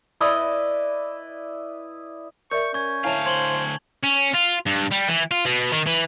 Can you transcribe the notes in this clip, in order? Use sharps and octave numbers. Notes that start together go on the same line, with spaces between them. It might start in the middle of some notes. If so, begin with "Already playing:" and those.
E4 B4 D5 D#5
A#4 D5 E5 C#6 G6
C#4 C#6 G#6
D2 E4 C#5 E5 F5 G#5 A5 F7
C5 G#6 F#7 G7
C#4
F4
G2
G3
E3
F4
B2
D#3
E3